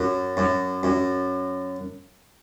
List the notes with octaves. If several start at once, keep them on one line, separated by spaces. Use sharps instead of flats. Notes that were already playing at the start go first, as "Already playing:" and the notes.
Already playing: F#2
F#2
F#2